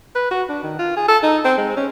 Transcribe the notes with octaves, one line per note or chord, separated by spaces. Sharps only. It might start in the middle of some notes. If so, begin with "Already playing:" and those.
B4
F#4
D4
D#3
F4
G#4
A4
D#4
C4
G#3
C#4